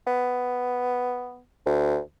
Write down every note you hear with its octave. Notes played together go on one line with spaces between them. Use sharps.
B3
D2